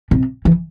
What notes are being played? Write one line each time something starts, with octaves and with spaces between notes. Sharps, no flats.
C3
E3